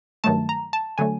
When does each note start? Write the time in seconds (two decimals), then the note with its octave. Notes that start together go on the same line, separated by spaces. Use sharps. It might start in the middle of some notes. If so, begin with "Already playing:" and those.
0.24 G2 D#3 F#3 A3 A5
0.49 A#5
0.73 A5
0.98 D3 F#3 A3 G#5